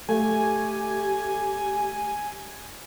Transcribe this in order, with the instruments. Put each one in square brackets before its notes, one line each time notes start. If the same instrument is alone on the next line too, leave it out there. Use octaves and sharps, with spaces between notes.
[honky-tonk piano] A3 [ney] G4 [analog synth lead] G#5